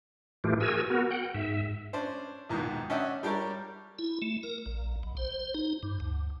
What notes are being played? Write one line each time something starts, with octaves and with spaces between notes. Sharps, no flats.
A2 E3 A3 F4 G4
F#4 G#4 A#4 G#5 E6
B3 F#4 A#4
F#5 G5
G#2 E5
C#4 D4 C5
A#1 D#2 G#2 B2 D#3
C#4 D4 D#5 E5 F#5 G5
G3 D4 G4 A#4 C#5
E4
A3
A#4
A#1
B1
C5
D#4
G2
D2